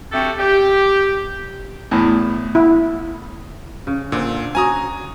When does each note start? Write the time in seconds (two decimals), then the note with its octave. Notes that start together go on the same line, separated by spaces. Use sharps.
0.12 A3 C4 D4 F#4 G4 A4
0.38 G4
1.91 E2 A2
2.55 E4
3.87 C#3
4.12 A#2 D3 C5
4.55 C#4 F#4 G#5 A#5 D#6